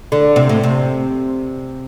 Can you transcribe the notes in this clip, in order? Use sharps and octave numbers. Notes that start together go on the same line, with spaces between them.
D3
C3
A2
C3